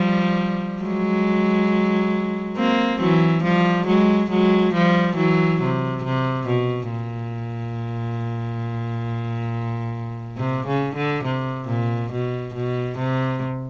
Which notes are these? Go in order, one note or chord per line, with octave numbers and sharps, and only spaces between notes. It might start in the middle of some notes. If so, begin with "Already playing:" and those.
Already playing: F3 G3
F#3 G#3
A#3 C4
E3 F#3
F3 G3
F#3 G#3
F#3 G#3
F3 G3
E3 F#3
C3
C3
B2
A#2
C3
C#3
D3
C3
A#2
B2
B2
C3